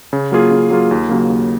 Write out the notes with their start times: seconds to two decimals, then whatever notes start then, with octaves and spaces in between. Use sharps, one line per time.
0.13 C#3
0.32 F#3 A#3 F4 G#4
0.51 C#3
0.70 F#3 A#3 F4 G#4
0.91 D#2
1.09 C#3 F#3 A#3
1.30 D#2